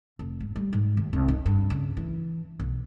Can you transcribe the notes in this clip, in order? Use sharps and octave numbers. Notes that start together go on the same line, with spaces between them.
F1
G#2
G3
G#2
D#2
C2
D#4
G2
C#3
E3
B1